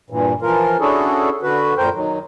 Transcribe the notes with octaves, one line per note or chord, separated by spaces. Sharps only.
G2 A#2 E3
E3 F3 F4 A#4
C#4 D4 E4 F#4 G#4 A4
D3 F#4 B4
F#2 A#2 A#4 C5 G5
D#3 F#3